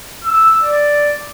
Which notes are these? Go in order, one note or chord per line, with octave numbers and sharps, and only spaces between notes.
E6
D5